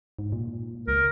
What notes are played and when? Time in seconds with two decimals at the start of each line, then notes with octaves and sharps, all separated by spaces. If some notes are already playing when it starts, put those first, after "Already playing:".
0.19 G#2
0.32 A#2
0.88 C#2 A#4